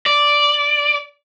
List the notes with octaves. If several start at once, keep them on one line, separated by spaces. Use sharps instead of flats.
D5